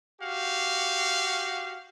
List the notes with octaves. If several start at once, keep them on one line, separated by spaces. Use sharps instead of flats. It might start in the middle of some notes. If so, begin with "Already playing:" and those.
F#4 G4 F5